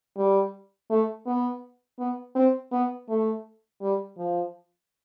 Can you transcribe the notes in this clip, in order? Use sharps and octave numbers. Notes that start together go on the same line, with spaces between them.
G3
A3
B3
B3
C4
B3
A3
G3
F3